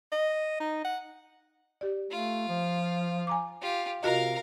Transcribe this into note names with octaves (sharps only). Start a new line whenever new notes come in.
D#5
D#4
F#5
G4 D5
A3 F4
F3
G#5 A#5 D6
F4 G4
C3 F4 F#4 A#4 D#5 F5